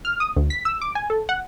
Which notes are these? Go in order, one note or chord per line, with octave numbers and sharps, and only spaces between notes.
F6
D#6
D2
B6
E6
D6
G#5
A4
F#5